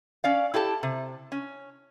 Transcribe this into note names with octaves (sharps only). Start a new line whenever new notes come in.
C#4 D5 F5
E4 G4 A4 A5
C3
C#4